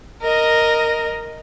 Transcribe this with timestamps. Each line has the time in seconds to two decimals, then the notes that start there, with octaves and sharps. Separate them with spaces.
0.22 A#4 D#5